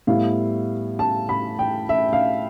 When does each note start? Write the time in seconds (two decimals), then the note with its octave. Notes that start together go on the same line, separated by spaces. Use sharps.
0.07 A2 G3 B3 E4 F5
0.99 A5
1.29 B5
1.59 G5
1.89 E5
2.13 F5